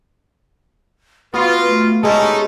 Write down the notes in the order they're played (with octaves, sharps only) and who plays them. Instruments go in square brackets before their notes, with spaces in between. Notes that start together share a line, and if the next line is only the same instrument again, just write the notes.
[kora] B3 F#4 [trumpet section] F4 [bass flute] B4
[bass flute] A3
[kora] G#3 A3 C#4 [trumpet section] D#4 E4 A4 [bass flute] G4